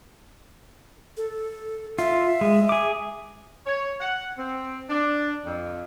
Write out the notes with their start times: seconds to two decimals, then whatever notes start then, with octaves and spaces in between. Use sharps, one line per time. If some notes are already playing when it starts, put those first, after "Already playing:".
1.17 A4
1.99 F4 E5
2.41 G#3
2.69 G#4 D6
3.66 C#5
4.00 F#5
4.38 C4
4.90 D4
5.45 F2